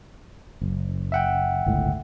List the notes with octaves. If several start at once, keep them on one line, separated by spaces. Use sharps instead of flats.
F#1
E5 F#5 G5
G1 C#2 A2